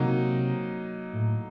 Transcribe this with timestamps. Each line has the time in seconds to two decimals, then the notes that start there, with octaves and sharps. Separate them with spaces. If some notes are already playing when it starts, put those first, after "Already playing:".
Already playing: C3 F#3 A#3 D#4
1.13 A2